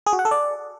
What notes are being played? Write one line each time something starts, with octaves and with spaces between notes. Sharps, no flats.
G#4
F#4
F#5
A4
D5